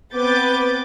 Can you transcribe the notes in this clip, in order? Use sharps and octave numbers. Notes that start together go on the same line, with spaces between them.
B3 C4 B4 D6 G6 A6